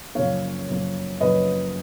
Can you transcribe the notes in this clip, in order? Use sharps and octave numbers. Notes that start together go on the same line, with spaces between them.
F#2 C#3 F3 A#3 C#5 F5
F#2 C#3 F3 A#3
F#2 C#3 F3 A#3 B4 D#5